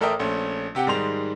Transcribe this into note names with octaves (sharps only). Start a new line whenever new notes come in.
A1 A4 A#4 E5 G5 D#6
A#1 A3 C#4
C3 G4 F#5 G5
G#2 D#3 G3 G#3 C6 F7